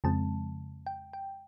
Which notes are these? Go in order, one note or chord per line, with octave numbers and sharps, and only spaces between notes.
F2 C#3 F3 G#3 C4 A5
G5
G5